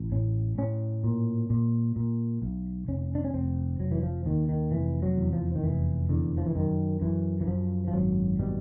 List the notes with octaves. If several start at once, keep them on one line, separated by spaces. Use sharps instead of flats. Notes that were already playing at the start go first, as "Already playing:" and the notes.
Already playing: A1
A2 C#4
A2 C#4
A#2
A#2
A#2
B1
F1 C#4
D4
C#4
F1 C4
F1 F#3
E3
F3
D#2 D#3
D#3
F1 E3
F#3
E2
F3
D#3
F1 E3
E2 D3
F3
E3
F#2 D#3
F#2 E3
E3
F#2 F3
F3
G#1 F#3
B2 G3